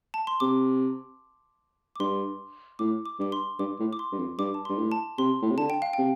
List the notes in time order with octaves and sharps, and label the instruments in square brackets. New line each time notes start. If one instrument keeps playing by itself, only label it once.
[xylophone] A5
C6
[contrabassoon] C3 [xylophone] D6
[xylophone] D6
[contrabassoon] G2 [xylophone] C6
[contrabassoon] A2 [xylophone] D6
[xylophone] D6
[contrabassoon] G2 [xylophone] D6
[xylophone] C6
[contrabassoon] G2 [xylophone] D6
[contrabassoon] A2
[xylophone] D6
C6
[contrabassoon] G2
F2
[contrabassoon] G2 [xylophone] D6
[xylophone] A5
C6
[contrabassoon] G2
A2
[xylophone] A5
[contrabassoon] C3 [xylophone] C6
[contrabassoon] A2
C3
[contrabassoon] D3 [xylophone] A5
[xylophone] G5
F5
[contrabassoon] C3 [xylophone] G5